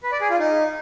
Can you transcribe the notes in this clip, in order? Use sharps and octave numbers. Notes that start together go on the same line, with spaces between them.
B4
D5
G#4
F4
D#4